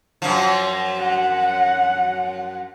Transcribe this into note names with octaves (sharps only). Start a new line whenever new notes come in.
F#2 F3
F#5